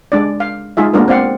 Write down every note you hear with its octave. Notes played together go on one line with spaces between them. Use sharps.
G#3 D4 D5
F5
G#3 D#4 F4 G#4 E5
G#3 A#3 B3 D4 F4 A#4
C4 D5 F5 F#5